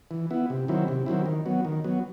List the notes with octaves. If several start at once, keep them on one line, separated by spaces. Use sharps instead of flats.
E3
B3 E4
C3
D#3 F#3 C4 E4
C3
D#3 F#3 C4 E4
D#3
F#3 B3
D#3
F#3 B3